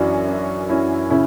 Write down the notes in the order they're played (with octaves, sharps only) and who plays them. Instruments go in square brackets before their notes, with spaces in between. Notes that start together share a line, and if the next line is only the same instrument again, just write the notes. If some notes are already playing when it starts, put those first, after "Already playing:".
Already playing: [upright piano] F#2 E3 C#4 D4 E4 F#4
D4
C#4 E4
C#3 C#4 E4